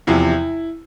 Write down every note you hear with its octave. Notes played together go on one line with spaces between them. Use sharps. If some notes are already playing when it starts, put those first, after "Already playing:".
E2 C3 F3 E4